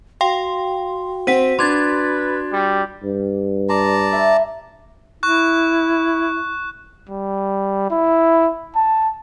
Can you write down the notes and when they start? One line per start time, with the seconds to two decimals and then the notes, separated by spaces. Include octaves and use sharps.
0.21 F#4 F5 G5 C6
1.27 C4 F#5 B6 D#7
1.59 D4 B4 C6 G#6 A6
2.53 G3
3.03 G2
3.69 D5 A5 A#5 C6
4.12 E5 B5
5.23 E4 C#6 F#6
7.09 G3
7.90 E4
8.76 A5